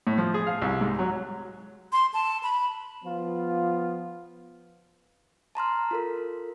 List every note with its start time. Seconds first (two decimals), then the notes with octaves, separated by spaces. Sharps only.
0.07 A2
0.18 F3
0.34 G#4
0.46 F5
0.62 C2
0.81 G#2
0.99 F#3
1.93 C6
2.14 A5
2.43 B5
3.04 F3 B3 F4
5.55 A5 A#5 C6 F6
5.91 F4 A4 A#4